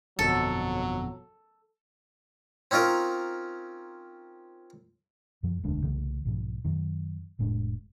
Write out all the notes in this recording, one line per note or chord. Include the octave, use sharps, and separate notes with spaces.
G1 F2 B2 F#3 A4
C4 C#4 D#4 F4 A#4
F#2 F3
E1 D2 G#3 D4
C2 C#3 E3 A3
B1 G#2 F3
F#2 D#3
F1 A2 G#3 D4